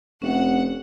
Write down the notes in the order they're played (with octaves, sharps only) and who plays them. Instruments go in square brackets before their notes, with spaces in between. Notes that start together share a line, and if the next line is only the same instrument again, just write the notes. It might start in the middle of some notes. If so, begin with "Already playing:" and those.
[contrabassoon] F1 [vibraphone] C#4 [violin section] F#5